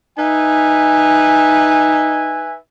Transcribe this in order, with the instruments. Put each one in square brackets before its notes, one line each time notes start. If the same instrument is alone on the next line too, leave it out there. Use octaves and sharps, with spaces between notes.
[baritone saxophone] D#4 [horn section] B4 E5 G#5